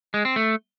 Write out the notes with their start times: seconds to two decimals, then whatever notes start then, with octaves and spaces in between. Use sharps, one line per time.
0.14 G#3
0.25 C4
0.36 A3